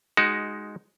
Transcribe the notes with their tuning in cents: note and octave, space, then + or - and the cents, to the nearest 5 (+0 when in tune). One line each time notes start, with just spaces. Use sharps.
G#3 +5 D#4 +0 F#4 +25